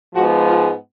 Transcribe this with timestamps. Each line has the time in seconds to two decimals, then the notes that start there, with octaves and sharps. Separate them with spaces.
0.14 G#2 F3 G#3 B3 F#4
0.44 F4